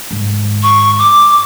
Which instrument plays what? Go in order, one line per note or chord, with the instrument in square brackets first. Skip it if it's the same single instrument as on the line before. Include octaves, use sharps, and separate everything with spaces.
[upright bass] G#2 D#3
[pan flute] C#6
D6